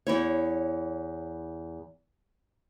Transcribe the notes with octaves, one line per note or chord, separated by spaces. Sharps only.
E2 E4 C#5